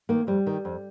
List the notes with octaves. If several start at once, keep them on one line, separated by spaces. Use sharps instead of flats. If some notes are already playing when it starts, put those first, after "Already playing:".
D#3 A#3
F2 G3
D#3
F2